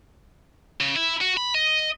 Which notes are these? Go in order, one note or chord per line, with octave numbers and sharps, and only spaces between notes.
C#3
E4
F#4
B5
D#5